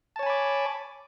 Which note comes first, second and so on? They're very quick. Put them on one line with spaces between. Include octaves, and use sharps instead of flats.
A5 C#5 G#5 B5 D6